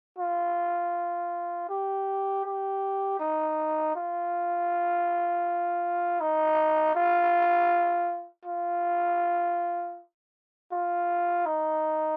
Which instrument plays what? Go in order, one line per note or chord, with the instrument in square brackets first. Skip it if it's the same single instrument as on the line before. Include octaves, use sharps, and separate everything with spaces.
[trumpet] F4
G4
G4
D#4
F4
D#4
F4
F4
F4
D#4